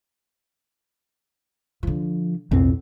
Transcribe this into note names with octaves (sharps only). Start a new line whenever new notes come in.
D3 F3
B1 F2 A2 C4